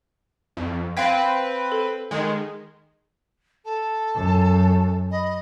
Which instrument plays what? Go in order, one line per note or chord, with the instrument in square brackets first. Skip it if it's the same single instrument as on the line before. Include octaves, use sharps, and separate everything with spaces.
[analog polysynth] F2
[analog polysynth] C4 B4 [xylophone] F5 G5 G#6
[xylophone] A4
[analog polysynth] D#3 G#3
[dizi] A4 [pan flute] A5
[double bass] F#2
[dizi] D#5 [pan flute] B5